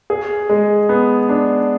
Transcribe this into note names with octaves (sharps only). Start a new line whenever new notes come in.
G#4
G#3
B3
D4